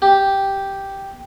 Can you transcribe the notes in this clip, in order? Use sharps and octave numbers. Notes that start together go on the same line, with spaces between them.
G4